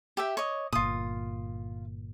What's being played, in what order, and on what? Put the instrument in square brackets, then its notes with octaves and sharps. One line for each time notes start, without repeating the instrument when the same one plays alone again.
[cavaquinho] G4 E5 G5
C#5 D#5
[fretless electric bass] G1 A#2 [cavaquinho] F4 D#6